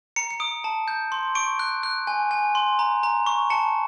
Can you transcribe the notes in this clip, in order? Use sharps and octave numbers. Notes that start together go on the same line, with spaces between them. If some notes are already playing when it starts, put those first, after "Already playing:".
A#5 C#7
C#7
D#6 D7
A5
G6
C6
C#6 D7
F#6
F#6
G#5
G#5
C6
A#5
A#5
C#6
A5 C#7